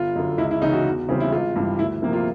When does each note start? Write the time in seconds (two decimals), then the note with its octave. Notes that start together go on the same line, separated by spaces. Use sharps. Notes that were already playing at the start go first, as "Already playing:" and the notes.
Already playing: G1 F4
0.16 F#2 D3
0.38 C#2 E4
0.51 E4
0.62 C#3 E3 D#4
0.73 F#4
0.85 E2
1.09 C#3 E3 G3 C4
1.20 E4
1.32 G#1 F4
1.56 G2 E3 G3
1.79 D2 E4
2.02 C3 F3 A#3
2.13 F4